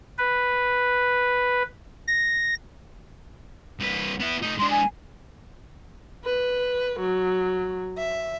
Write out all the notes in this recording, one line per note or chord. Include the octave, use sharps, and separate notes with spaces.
B4
A#6
C2 B4
B3 E4
A3 D#4
G#3 D4 C6
G#5
B4
F#3
E5